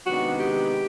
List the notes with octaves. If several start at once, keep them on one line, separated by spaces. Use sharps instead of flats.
C3 D#3 G#3 B3 D4 F#4
G4